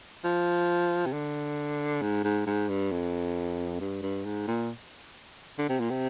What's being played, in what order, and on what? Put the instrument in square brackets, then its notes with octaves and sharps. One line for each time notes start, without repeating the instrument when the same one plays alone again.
[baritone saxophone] F3
C3
D3
G#2
G#2
G#2
G2
F2
G2
G2
G#2
A#2
D3
C3
A#2
C3